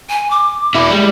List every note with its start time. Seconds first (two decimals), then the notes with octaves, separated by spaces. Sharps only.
0.10 G#5
0.31 D6
0.75 B2 E4
0.90 G3 G#3